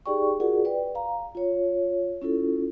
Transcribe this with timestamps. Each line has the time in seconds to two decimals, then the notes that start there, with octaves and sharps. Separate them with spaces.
0.06 D#4 G4 G#4 D5 G5 C#6
0.40 F4 F#4 G#4 A#4 D5 F#5
0.65 B4 D5 G5
0.95 F5 A#5
1.35 F4 C#5
2.22 C#4 E4 F4 A4